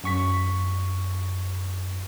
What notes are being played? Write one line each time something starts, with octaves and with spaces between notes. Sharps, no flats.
F#2 C#6 B6